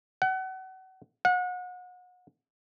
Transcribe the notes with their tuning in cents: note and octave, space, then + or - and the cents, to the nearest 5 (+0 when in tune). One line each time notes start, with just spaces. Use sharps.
F#5 +30
F#5 -35